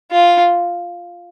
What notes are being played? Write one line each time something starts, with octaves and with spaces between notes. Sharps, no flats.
F4